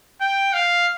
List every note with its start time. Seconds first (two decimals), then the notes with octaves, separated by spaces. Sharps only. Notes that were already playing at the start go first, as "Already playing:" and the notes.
0.21 G5
0.54 F5